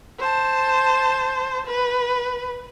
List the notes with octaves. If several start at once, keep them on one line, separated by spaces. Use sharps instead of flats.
C5 A5
B4